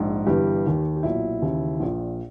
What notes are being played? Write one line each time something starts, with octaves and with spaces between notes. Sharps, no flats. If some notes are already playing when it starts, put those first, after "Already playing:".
Already playing: A#1 G#2
G1 G2 E3 G4
D#2 D#3
G4
B1 A#2 E4
D#2 C#3 E3
A#1 A#2